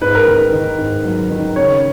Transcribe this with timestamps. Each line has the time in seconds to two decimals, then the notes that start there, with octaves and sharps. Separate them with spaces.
0.01 G#2 B4
0.15 A#4
0.27 D#3 B4
0.53 D#3
0.78 G#2
1.05 F#3
1.30 D#3
1.56 C#3 C#5